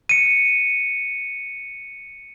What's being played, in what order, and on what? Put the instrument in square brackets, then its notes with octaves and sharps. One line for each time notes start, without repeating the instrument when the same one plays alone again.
[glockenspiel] C#7 D#7